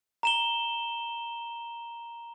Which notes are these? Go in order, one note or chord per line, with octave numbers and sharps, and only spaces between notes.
A#5 E7 G7